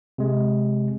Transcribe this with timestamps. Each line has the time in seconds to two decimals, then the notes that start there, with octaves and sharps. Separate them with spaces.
0.18 C3 G#3